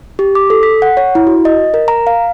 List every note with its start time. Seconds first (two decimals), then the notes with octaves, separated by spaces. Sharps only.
0.19 G4
0.35 D6
0.50 A4
0.63 B6
0.82 F#5
0.97 C#5
1.15 E4
1.27 F#4
1.45 D#5
1.74 A#4
1.88 A#5
2.07 F5